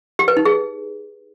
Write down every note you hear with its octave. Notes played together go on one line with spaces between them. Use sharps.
G4
B4
D#4
G#4